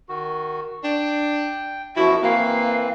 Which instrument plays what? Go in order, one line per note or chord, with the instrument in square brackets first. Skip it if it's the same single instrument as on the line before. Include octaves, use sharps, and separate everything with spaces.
[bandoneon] D#3 F#4
[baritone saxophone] D4 [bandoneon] G5
[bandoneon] F#2 B2 F3 [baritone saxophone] E4 [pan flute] F#4
[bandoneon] E3 C4 B4 [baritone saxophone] A#3 [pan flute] F5